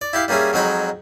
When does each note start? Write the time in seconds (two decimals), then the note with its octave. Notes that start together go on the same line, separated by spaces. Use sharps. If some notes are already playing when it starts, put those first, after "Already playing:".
0.01 D5
0.13 E4 G4 F5
0.28 G3 A#3 C#4 G#4 E5
0.53 F2 F#3 G#3 D#4 C#5 B5